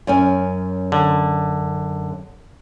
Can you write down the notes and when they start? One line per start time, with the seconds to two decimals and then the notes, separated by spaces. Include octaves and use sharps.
0.07 F#2 C#4 G#5
0.92 D3